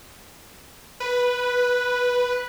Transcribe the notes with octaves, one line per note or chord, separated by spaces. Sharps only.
B4